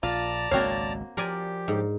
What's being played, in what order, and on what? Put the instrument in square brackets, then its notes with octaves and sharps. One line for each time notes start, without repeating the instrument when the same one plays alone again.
[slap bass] A#1 [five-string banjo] F4 [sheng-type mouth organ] D5 A5 A#5
[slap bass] G#1 C#2 [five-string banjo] A#3 C4 C#5 [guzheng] F#4 F5
[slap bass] F3 [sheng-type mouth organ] G4 [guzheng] A#4 D5 G#5
[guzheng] G#2